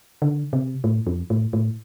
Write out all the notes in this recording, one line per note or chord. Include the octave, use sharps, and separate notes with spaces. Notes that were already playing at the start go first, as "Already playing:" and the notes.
D3
C3
A2
F2
A2
A2